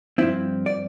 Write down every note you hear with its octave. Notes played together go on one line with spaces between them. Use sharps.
G2 F3 C4 E4
D5